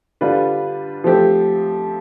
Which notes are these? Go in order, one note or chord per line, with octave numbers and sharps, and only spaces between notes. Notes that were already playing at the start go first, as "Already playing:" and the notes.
D3 G3 D4 F4 B4
F3 A3 C4 G4